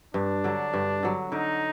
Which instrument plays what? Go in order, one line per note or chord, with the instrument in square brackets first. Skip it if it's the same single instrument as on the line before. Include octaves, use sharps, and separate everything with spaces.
[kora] G2 [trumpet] D4
[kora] D3 F#3
G2
D3 F#3
[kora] D3 [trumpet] D#4